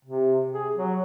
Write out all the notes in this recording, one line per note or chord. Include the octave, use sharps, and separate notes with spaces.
C3
G#4
F#3